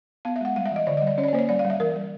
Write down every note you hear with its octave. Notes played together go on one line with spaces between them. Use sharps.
B3 F5
E5
G#3 F#5
G3 F5
E5
E3 D#5
D3 D5
D#5
G3 D5
C#4 C#5
D5
C#5
A#3 C5
C#5
G3 D5
F5
G3
E5
E3 A#4
G3